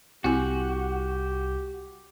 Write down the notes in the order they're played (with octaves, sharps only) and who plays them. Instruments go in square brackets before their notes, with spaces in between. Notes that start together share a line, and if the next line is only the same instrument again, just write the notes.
[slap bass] C2 G3 [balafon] C4 E4 G#5 [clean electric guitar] F#4 [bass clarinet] G4